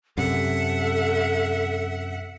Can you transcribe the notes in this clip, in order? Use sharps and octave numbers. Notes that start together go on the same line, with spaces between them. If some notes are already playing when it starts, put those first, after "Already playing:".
F#2 C3 A4 E5 F#5